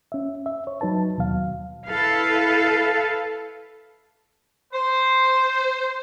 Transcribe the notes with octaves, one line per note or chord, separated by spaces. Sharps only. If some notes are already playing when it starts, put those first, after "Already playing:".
C#4 E5
E5
C#5
F#3 D#4 B4 A5
D#2 B2 F#3 F5
E4 A4 B4 F5
C5